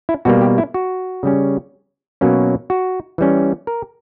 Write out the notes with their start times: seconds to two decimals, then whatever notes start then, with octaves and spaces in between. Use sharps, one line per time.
0.09 E4
0.25 B2 G3 A#3 F#4
0.42 G4
0.58 E4
0.74 F#4
1.23 C#3 G3 C#4
2.21 B2 F#3 A#3 C#4
2.70 F#4
3.18 E3 G3 C#4
3.67 A#4